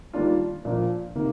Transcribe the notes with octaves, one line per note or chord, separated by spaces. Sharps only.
D#3 G3 A#3 D4 F4
A#2 F3 A#3 D4 F4
C3 D#3 A#3